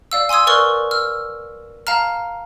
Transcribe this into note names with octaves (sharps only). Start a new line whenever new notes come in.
D5 F5 E6
G#5 C6 D#6 E6 G#6
A#4 B4 D5 C#6 F6
E6 F6
F5 A5 A#5 F6